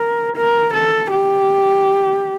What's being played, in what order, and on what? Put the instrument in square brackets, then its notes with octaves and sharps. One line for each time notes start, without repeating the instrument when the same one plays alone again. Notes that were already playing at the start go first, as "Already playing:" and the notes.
Already playing: [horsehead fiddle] A#4
A#4
A4
G4